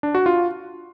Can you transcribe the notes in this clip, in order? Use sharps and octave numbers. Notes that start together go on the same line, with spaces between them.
D4
F#4
F4